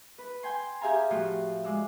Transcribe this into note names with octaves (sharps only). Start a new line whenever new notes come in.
B4
G5 G#5 C6
G4 G#4 E5 F5 G#5 A#5
A2 F3 F4 F#4
G#3 D5 E6